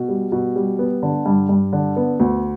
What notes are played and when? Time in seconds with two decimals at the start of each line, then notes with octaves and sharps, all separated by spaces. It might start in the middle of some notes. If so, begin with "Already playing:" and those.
Already playing: B2
0.09 G3
0.32 B2
0.56 G3
0.79 B3
1.03 D3
1.26 G2
1.49 G2
1.73 D3
1.96 B3
2.20 D2